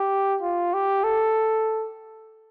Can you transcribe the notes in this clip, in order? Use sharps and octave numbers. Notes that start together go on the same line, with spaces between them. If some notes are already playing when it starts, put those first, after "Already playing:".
Already playing: G4
F4
G4
A4